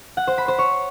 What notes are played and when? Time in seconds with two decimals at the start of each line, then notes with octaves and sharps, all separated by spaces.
0.17 F#5
0.27 C5
0.38 B5
0.48 C5
0.59 C#5